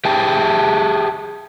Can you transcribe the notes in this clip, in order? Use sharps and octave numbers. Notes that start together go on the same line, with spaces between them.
G4 G#4 E5 G5 A5